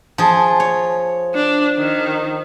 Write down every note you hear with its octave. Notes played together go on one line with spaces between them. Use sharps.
F3 G#4
C#5
D4
D#3